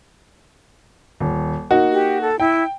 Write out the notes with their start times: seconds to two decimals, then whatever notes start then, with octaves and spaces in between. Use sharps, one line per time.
1.20 D#1
1.71 A#3 D#4 F#4
1.92 G4
2.21 A4
2.40 E4 G5